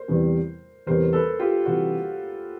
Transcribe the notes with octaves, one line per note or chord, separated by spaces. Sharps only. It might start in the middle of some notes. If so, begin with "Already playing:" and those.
Already playing: A#4 C5
E2 C3 E3 G3
E2 C3 E3 G3 A#4 C5
A4 B4
F4 G4
C3 E3 G3 F#4